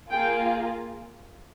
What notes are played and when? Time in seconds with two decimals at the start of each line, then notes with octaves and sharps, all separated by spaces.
0.11 A#3 F4 G#4 G5